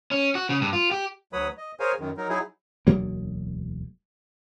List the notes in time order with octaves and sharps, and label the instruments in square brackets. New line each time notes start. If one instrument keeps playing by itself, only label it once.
[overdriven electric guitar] C#4
F#4
C#3
G2
F4
G4
[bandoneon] D2 F#3 B4 C#5 B5 D#6
D#5
G#4 A#4 C5 C#5 F5 G#5
F#2 D#3
F#3 D#4 A#4
F#3 D#4 E4 G#4
[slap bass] E1 D2 F#3 A#3